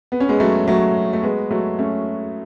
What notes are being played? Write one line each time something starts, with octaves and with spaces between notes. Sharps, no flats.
B3
C#4
G#3 B3
F#3 A3
F#3 A3
A3
G#3 B3
F#3 A3
A3 C#4